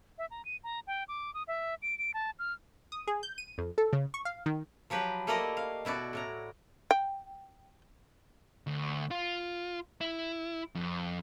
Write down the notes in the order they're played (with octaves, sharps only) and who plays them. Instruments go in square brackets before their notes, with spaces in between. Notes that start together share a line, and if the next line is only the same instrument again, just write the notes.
[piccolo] E5
A#5
D#7
A#5
G5
D6
D#6
E5
D7
D7
A5
F6
[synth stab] D#6
G#4
G6
D#7
F2
A4
C#3
C#6
F5
D#3
[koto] F3 F#3 G4 B4
A3 A#3 E4 A#4 D5 D#5
F5
B2 E4 F#4 D5
A2 D5 A#5
[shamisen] G5
[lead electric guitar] D2
F4
E4
F2